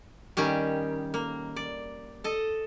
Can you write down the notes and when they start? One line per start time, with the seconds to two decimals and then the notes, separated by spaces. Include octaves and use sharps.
0.37 D#3 G3 C#4 G4
1.14 A#3
1.56 D5
2.24 A4 D#5